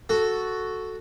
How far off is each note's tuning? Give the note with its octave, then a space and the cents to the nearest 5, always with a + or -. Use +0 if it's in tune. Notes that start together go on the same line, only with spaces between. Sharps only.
F#4 +0 A4 +0